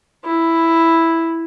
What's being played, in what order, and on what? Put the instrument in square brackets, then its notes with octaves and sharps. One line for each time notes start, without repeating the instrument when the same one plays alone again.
[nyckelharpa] E4